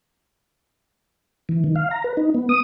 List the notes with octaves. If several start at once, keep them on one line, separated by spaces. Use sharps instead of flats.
E3
D#3
F5
A#5
B4
D#4
B3
D#6